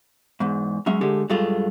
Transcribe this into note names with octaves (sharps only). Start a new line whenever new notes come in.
E2 G#2
F#3 G#3 C#4 E5
D3 G#3 A3 G4
G2 F#3 G#3 A3 F4